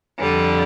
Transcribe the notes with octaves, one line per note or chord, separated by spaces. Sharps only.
F2 D3 G3